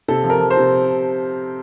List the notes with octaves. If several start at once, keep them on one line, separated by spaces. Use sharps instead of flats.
C3 A4
F3
A#4
F3
C5
C3